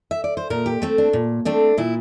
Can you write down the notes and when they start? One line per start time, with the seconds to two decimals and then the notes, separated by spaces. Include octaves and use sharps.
0.11 E5
0.24 D5
0.37 C5
0.50 A#2 A#4
0.66 G4
0.82 A3 C4
0.98 D4
1.13 A#2
1.45 A3 C4 D4
1.78 A#2 E4